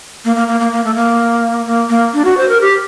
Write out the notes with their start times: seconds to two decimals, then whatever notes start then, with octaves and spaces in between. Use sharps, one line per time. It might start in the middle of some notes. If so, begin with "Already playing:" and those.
0.25 A#3
0.36 A#3
0.48 A#3
0.60 A#3
0.72 A#3
0.84 A3
0.95 A#3
1.66 A#3
1.90 A#3
2.14 D4
2.25 F#4
2.37 C5
2.49 A#4
2.61 G4